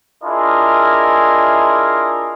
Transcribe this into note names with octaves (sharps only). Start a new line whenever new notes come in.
D4 E4 F4 G#4 A#4 D#5